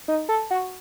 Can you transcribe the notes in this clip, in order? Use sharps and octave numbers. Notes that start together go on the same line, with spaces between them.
D#4
A4
F#4